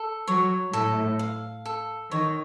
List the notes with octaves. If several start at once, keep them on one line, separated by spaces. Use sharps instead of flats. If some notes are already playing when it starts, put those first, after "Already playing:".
Already playing: A4
F#3 C#5
A2 A4
F5
A4
D#3 C#5